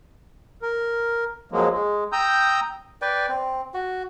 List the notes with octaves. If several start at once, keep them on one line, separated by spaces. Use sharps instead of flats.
A#4
F2 F3 F#3 G#3 A#3
G#3
G5 A#5 D#6 E6 G6
B4 D5 G5
C4
F#4